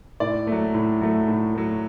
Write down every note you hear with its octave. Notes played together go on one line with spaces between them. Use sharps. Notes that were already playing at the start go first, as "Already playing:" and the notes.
A2 D5
F#3 A3
A2
F#3 A3
A2
F#3 A3